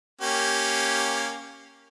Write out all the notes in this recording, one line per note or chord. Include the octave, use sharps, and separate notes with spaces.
A#3 C#4 G4